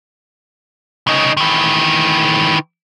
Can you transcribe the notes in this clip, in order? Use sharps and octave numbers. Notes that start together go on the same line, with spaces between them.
C#3 D#4
D#3 E3